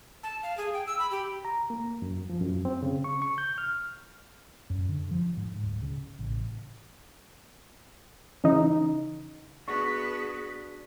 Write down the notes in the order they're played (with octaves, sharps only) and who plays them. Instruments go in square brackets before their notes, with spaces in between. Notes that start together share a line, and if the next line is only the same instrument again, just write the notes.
[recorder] A5
F5
G#4
G5
E6
B5
G4
[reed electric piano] A#5
A#3
F#2
F3
F#2
C4
C#3
C#6
C#6
G6
F6
[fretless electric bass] F#2
D3
F3
G#2
D1
C#3
A1
[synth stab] C#3 E3 D#4
[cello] B3 B4 [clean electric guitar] D4 F#4 [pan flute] G#4 [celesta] C#6